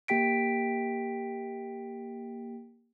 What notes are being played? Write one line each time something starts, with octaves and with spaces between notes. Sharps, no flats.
A#3 G4 G5 B6 D7